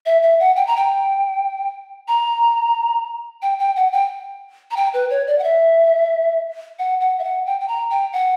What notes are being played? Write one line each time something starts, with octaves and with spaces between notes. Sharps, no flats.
E5
E5
F#5
G5
A#5
G5
A#5
G5
G5
F#5
G5
A#5
G5
B4
C#5
D5
F#5
E5
F#5
F#5
E5
F#5
G5
G5
A#5
G5
F#5